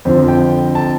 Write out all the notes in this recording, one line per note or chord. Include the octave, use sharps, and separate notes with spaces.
F2 D3 F3 C5
G5
A5